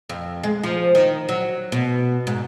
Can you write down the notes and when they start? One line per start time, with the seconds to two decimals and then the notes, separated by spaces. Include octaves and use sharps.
0.09 F2
0.43 G#3
0.63 F3
0.95 D#3
1.29 F#3
1.72 B2
2.27 G#2